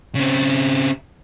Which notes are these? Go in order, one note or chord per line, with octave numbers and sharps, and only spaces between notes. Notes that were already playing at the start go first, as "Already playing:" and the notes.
C#3 C4